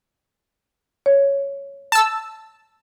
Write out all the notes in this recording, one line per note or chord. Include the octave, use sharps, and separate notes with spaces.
C#5
A5 E6